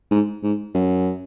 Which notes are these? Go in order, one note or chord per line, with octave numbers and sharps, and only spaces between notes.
G#2
G#2
F#2